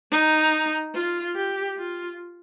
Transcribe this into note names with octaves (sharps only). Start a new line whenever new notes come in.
D#4
F4
G4
F4